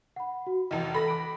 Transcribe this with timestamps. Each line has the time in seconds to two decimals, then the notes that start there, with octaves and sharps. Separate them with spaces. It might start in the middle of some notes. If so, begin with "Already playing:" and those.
0.16 F#5 B5
0.47 F#4
0.71 F1 E2 D#5
0.95 A4 B5 A#6
1.08 D6 F#6 D7